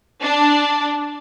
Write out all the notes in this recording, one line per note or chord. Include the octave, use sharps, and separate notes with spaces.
D4